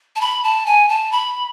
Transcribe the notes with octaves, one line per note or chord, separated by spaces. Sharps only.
A5
B5
A5
G#5
A5
B5